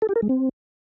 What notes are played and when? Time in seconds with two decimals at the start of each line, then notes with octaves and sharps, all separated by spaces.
0.02 A4
0.09 G4
0.16 A#4
0.22 G#3
0.29 C4